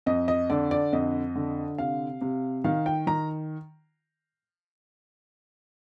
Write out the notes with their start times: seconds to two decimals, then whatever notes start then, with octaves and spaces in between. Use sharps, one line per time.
0.06 F2 D#5
0.28 D#5
0.50 D3 D5
0.71 D5
0.93 F2 D#5
1.35 D3
1.78 C3 F5
2.21 C3
2.64 D#3 F5
2.86 G5
3.07 D#3 A#5